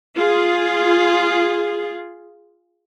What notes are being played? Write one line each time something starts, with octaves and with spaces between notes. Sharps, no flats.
F4 G#4